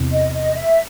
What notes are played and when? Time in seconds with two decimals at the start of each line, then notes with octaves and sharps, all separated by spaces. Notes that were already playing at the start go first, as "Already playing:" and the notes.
Already playing: E2 C3 E3
0.12 D#5
0.34 D#5
0.57 E5